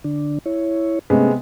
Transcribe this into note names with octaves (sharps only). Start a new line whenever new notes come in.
D3 D4
E4 C#5
C3 G#3 A3 B3 C#4